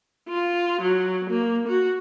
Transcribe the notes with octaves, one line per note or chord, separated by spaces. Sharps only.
F4
F#3
A#3
F#4